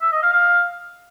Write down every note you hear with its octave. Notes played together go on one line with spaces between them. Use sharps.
E5
D#5
F5
F5